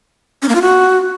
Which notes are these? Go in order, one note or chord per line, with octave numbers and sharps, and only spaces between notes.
C#4
A#3
F4
F#4